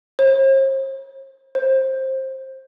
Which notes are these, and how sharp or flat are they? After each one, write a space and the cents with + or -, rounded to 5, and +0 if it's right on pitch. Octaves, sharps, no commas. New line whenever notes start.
C5 +45
C5 +20